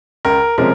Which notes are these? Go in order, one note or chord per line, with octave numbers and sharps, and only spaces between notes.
C#2 A#4
C3 F3 G#3 C#4 A#4